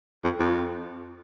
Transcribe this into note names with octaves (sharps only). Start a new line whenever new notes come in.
F2
F2